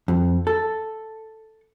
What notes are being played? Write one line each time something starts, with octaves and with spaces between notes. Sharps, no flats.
F2
A4